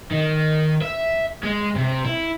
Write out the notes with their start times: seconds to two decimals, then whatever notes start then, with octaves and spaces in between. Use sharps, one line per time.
0.11 D#3
0.82 E5
1.43 G#3
1.75 C3
2.05 E4